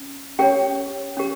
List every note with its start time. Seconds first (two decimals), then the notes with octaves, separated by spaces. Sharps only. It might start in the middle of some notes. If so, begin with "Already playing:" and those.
Already playing: C#4
0.39 C#4 G4 A#4 C#5 G5
1.17 C#4 G4 A#4